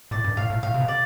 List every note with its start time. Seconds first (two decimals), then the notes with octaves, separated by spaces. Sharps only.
0.11 A2 D5
0.25 G2
0.37 A2 F5
0.50 A2
0.63 A2 F5
0.74 C3
0.80 B2
0.88 D5